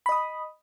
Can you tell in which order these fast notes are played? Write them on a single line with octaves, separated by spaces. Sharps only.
B5 D#5 D#6